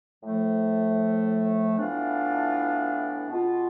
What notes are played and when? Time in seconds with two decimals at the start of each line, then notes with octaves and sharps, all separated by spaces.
0.23 A2 F3 A3
1.76 A2 E3 B3 D4 F4
3.28 B2 G#3 C4 F4